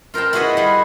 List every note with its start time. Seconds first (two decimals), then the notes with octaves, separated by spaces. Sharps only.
0.14 F4 A#4 C5 G5 A5
0.33 E4 F#4 G#4 B4 D#5 F#5
0.57 G3 G#4